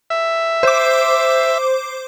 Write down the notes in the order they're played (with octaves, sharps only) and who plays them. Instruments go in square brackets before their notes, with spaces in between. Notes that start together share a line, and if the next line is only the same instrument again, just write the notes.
[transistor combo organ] E5
[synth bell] C5 D6